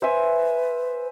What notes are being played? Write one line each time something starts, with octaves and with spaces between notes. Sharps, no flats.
B4 C5 E5 G#5